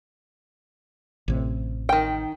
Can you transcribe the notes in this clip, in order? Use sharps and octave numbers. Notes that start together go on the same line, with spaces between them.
A1 C3
D#3 G5